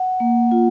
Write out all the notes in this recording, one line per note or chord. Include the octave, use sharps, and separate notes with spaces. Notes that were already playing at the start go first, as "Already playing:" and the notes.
Already playing: F#5
A#3
F4